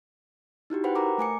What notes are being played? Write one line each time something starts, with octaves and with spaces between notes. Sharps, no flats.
D#4 E4 F#4 G4
B4 C5 F#5 G5 B5
A#4 A#5 D6
A3 G#5 D6 C#7